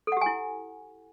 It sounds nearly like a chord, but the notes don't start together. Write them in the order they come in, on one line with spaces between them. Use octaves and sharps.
A4 F#5 G4 G#5 E4